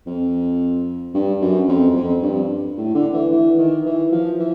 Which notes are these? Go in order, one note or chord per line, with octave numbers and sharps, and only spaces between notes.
F2
G2
F#2
F2
F2
G2
A2
D3
E3
E3
D#3
E3
F3
E3